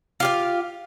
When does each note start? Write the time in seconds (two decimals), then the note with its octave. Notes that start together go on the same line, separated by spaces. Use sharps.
0.20 F4 G4 F5